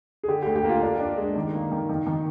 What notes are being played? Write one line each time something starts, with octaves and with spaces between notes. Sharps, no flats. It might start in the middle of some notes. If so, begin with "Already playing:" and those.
G#4
D3 G4
D2 G4
G4
A#3
F4
D4 G4
D4
G#3
D#3
A#3
D#3
D#3
D#3